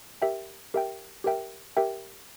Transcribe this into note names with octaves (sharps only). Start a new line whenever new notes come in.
G4 A#4 E5 G5
G4 A#4 E5 G5
G4 A#4 E5 G5
G4 A#4 E5 G5